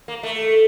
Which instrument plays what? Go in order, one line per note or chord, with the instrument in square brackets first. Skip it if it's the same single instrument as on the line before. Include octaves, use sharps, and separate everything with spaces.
[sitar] A#3
A3